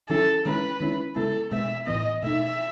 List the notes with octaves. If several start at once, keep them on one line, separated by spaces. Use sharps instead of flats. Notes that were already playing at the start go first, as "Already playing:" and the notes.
D#3 F#3 C#4 E4 A4
D#3 G#3 C#4 E4 B4
D#3 G#3 C#4 E4
C#3 G#3 B3 E4 A4
B2 G#3 B3 E5
A2 E3 B3 D#5
B2 A3 D#4 E5